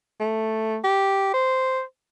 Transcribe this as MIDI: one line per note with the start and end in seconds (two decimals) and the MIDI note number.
0.20 0.78 57
0.84 1.32 67
1.34 1.82 72